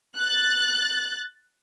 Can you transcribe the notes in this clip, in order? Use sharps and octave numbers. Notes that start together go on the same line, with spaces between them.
F#6 A6